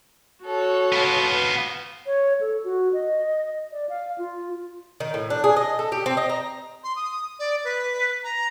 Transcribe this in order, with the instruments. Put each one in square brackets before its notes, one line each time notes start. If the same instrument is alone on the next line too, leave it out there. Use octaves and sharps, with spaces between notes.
[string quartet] F#4 A4 C#5
[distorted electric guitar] B3 F4
[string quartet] B4
[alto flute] C#5
A4
F#4
D#5
D5
F5
F4
[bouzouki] D#3
A2
D4
G#4
D#5
A4
G4
C4
D#5
A#5
[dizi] C6
D#6
D5
B4
A#5